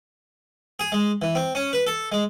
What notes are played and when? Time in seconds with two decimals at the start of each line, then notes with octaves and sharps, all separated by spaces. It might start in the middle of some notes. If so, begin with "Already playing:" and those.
0.79 G#4
0.92 G#3
1.22 E3
1.35 C4
1.55 C#4
1.73 B4
1.87 A4
2.12 G#3